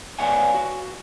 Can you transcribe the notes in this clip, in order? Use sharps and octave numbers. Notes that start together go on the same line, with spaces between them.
B4 C#5 D5 F5 F#5 G#5
F#4